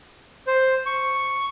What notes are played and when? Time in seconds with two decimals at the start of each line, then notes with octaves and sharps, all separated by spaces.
0.47 C5
0.86 C#6